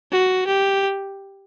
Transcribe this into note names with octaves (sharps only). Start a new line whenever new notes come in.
F#4
G4